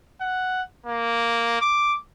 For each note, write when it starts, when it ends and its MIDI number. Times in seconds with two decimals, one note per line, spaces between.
0.21 0.62 78
0.86 1.57 58
1.61 1.97 86